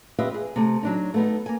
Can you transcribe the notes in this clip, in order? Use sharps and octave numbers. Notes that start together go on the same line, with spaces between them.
F4 G4 B4 D#5 E5
G#4
C3 A3
F#3 D4 D#4
A3 B3 D#4
A#3 G#5